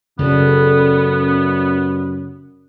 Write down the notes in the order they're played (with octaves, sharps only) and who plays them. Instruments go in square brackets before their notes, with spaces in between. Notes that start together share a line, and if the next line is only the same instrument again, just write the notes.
[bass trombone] F#2 [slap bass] C#3 [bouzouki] G3 A4 [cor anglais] B3